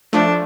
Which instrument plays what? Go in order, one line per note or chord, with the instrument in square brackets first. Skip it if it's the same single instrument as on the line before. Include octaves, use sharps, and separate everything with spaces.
[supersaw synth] F3 A3 [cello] D4